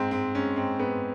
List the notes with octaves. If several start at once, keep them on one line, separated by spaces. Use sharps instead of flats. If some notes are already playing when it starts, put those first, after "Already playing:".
Already playing: G#2 C4
G#2 C4
G#2 C#4
G#2 C4
G#2 B3